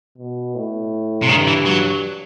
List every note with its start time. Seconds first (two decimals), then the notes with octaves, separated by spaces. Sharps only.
0.18 B2
0.55 A2
1.22 C3
1.29 G2 D#3
1.47 E3
1.66 F#3